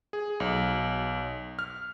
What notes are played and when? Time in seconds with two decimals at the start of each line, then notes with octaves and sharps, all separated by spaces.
0.13 G#4
0.40 B1
1.59 F6